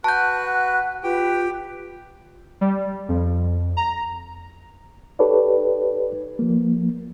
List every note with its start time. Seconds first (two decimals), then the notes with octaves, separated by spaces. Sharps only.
0.04 F#4 B4 F#5 A5 F#6 G6
1.03 F4 G4 B4 G5
2.61 G3
3.09 F2
3.77 A#5
5.19 D#4 G4 A4 B4 C#5 D5
6.39 F3 A#3